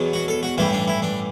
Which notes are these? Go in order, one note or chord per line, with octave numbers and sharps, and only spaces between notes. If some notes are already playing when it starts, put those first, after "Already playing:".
Already playing: E2 B2 F#3
F#4
A4
F#4
A1 G2 E3 G3 E4
D4
E4
D4